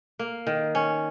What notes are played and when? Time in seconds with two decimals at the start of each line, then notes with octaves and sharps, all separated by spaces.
0.19 A#3
0.47 D#3
0.75 C#4